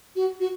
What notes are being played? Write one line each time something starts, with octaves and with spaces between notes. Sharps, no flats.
F#4
F#4